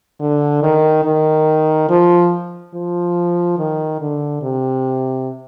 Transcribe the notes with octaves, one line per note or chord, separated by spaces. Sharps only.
D3
D#3
D#3
F3
F3
D#3
D3
C3